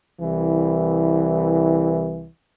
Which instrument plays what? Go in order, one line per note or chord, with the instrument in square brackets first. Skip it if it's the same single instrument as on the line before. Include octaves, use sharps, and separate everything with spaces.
[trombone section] C2 E3